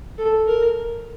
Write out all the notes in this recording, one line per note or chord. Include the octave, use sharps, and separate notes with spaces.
A4
A#4